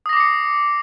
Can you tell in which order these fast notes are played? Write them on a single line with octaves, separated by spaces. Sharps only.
D#6 A#6 D6 C7 C#7